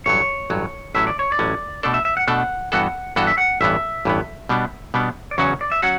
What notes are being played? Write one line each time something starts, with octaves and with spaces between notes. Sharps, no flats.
A1 G2 F#3 C#5
A1 G2 F#3
A1 A2 F#3 C#4 E5
D5
C#5
D5
A1 A2 F#3 C#4
B2 A3 D4 A4 D5
E5
E5
F#5
B2 A3 D4 A4 F#5
G2 E3 B3 F#4 A4 F#5
G2 E3 B3 F#4 A4 F#5
E5
F#5
A1 G2 E3 B3 E5
A1 G2 E3 B3
B2 G3 B3 D4
B2 G3 B3 D4
D5
E2 C#3 F#3 C#4 F#4 C#5
D5
E5
F#3 C#4 F#4 F#5